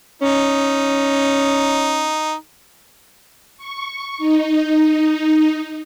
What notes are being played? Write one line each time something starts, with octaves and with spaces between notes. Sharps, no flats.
C#4 D#4
C#6
D#4